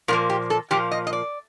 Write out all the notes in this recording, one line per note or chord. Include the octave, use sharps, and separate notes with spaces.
A#2 F3 A#3 A#4
G4
A4
A#2 F3 A#3 G4
D#5
D#5
D5